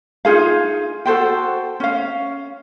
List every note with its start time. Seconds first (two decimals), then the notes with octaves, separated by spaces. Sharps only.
0.25 D#4 F4 G#4 F5
1.06 F#4 A4 C5 G5
1.80 C#4 F5